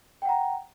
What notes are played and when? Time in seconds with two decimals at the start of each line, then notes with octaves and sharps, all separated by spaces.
0.22 G5
0.25 F#5
0.29 A#5